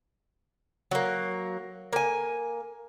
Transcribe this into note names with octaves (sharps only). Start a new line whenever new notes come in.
F#3 A#3
A#3 G#5